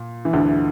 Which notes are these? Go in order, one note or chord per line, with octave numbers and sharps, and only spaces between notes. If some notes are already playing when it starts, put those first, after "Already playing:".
Already playing: A#2
E3
D2 D3